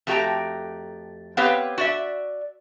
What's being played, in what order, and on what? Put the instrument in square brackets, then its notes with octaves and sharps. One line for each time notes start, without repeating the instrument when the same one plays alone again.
[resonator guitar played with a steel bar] F2 A3 F#4 G4 G5 A#5
B3 C4 G4 B4 C#5 F5
F#4 D5 E5